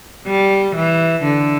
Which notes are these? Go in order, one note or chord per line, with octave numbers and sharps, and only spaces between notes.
G3
E3
D3